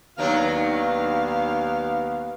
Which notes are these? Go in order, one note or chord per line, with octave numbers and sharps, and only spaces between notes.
D#2 D#3 F#3 B3 D4 F5